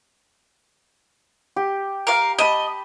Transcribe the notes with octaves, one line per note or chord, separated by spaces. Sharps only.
G4
A#4 F5
D#5 A5 B5